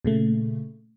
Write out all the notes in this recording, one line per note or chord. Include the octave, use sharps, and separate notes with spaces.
A#2 C#3 A3